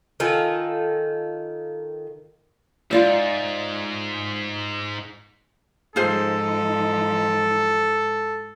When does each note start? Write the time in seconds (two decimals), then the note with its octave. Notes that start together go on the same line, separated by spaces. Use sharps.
0.20 D#3 F4 A4 G#5
2.91 G#2 F4 D5 E5
5.96 G#2 F3 D#4 F4 G#4 A4 C5